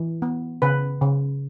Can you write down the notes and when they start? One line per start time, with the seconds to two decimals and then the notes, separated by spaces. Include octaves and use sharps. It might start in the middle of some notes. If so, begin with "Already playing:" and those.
Already playing: E3
0.22 B3
0.62 C#3 B4
1.02 C#3